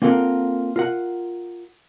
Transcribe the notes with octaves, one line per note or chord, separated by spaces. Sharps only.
A#3 C4 F4 A4 A#4 F#5
F4 A#4 F#5